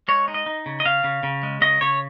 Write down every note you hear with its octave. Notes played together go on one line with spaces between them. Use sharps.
G#3 C#5
D#4
D#5
D#4
C#3
D#5
C#3 F5
C#3
C#3
G#3
C#3 D#5
C#3 C#5